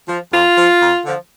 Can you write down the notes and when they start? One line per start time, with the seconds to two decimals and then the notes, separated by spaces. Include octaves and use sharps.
0.08 F3
0.33 F2 F4
0.58 F3
0.82 F2
1.06 D3 F3